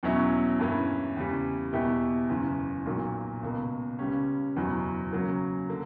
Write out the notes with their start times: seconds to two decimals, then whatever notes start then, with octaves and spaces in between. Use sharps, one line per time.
0.03 E2 B2 F#3 C#4 E4
0.60 G2 E3 A#3 C#4
1.16 E2 C#3 G3
1.73 E2 B2 A#3 E4 G4
2.29 F#1 E2 C#3
2.85 B1 A#2 F#3 A#3
3.43 C#2 B2 A#3
3.99 C#2 C#3 G3 C#4
4.56 F#1 E2 B2 F#3 B3
5.13 C#3 F#3 A#3
5.69 D3 A#3